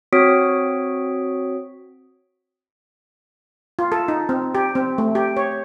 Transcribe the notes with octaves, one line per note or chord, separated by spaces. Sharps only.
C4 F#4 C#5 D#6 B6 D7
F4
A4
D#4
C4
G4
C4
A3
G4
C#5